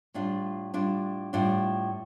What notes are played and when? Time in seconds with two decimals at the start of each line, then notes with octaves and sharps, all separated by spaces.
0.14 A2 G3 D4 F4
0.74 A2 G3 D4 F4
1.33 A2 G3 D4 F4